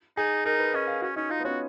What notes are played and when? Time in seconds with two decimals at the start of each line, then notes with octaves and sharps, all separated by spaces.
0.17 D#4 G#4
0.45 D#4 A#4
0.59 B4
0.74 C#4 D#5
0.87 F5
1.02 C#4 F#4
1.16 C#4 D#4
1.30 D#4 F4
1.40 B3
1.44 C#4 F#4